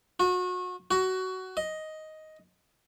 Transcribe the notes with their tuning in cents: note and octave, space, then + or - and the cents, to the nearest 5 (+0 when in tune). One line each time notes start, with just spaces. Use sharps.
F#4 -30
F#4 +20
D#5 +5